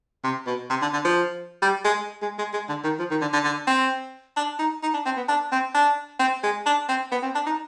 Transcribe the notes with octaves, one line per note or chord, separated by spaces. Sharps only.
C3
B2
C3
D3
D3
F3
G3
G#3
G#3
G#3
G#3
D3
D#3
F3
D#3
D3
D3
D3
C4
D4
D#4
D#4
D4
C4
B3
D4
C4
D4
C4
G#3
D4
C4
B3
C4
D4
D#4